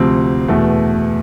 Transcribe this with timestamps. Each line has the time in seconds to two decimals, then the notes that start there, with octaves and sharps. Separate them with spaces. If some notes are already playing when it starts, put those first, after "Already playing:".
Already playing: D2 C3 F3 C4
0.48 E2 B2 A3